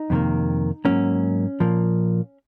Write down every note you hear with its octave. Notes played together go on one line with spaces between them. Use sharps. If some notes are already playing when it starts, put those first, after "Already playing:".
Already playing: D#4
F2 C3 D#3 A#3
G#2 F#3 A#3 C#4
A#2 F3 A#3